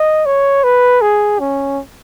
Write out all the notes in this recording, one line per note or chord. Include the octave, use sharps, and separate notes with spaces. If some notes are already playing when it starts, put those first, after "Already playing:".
Already playing: D#5
C#5
B4
G#4
C#4